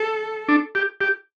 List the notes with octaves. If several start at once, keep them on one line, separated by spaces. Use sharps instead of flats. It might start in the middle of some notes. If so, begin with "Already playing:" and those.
Already playing: A4
D4
G4
G4